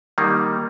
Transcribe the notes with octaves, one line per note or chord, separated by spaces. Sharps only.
D#3 G3 A#3 D#4